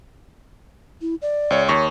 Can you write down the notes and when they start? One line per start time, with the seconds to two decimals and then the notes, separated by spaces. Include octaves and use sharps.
1.01 E4
1.22 D5
1.50 C#2 C#5
1.68 D#2 C#5 C#6